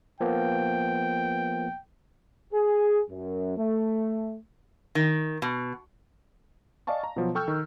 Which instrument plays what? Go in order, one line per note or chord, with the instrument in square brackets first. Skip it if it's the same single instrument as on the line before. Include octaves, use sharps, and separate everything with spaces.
[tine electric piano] F3 A#3 B3 [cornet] G5
[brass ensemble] G#4
F#2
A3
[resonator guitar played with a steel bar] D#3
B2
[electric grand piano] D5 D#5 F5 G#5 A5 C#6
A#5
B2 F3 F#3
A4 G5 C#6 E6 F6 G6
D#3